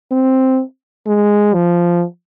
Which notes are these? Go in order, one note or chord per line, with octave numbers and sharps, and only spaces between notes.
C4
G#3
F3